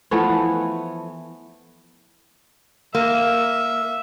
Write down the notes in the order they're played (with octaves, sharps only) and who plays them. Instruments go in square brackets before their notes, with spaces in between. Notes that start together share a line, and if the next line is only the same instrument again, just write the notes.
[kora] E3 F3 A3 B3
[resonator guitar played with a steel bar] A#3 [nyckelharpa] E5